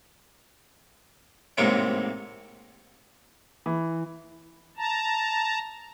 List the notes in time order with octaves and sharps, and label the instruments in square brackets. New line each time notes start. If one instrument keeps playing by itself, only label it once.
[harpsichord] A1 G#2 C3 A#3 C#5 G5
[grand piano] E3
[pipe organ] A5 A#5